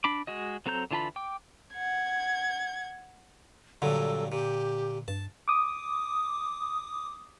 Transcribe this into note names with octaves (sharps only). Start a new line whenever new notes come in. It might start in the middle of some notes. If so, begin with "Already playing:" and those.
D4 B5 D6
G#3 F#4 D#5
F#3 C4 A4 A#5 G6
D3 E3 F4 A5 B5
G5 D6
F#5 G#6
G2 A#2 D3 F#3 A4
A#2 G4
G2 A5
D6 D#6